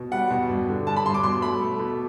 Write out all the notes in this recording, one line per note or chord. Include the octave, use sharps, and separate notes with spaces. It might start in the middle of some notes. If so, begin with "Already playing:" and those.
Already playing: B2
G3 F#5
B2
G2
D3
G3 A5
B5
G2 C6
D6
B2 C6
A3 B5
A3
B2